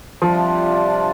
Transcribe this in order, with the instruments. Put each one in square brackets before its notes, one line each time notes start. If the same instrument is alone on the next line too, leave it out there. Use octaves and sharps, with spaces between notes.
[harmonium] C3 G3 D4 F4 [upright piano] F3